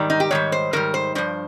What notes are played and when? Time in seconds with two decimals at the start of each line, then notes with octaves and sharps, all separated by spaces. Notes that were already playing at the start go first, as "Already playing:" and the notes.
Already playing: G#2 D#3 G3
0.10 D#4
0.20 G4
0.31 G#2 D#3 G3 C#5
0.52 C5
0.73 G#2 D#3 G3 A#4
0.94 C5
1.15 G2 F3 C5